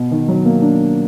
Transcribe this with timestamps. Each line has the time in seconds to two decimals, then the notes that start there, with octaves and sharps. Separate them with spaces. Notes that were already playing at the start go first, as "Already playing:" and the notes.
Already playing: B2
0.11 D#3
0.28 F#3
0.45 A#3
0.62 D4